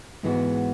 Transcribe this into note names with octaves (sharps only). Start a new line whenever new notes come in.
G#2 E3 G#3 B3 F#4